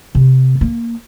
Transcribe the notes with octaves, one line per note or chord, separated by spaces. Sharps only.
C3
A#3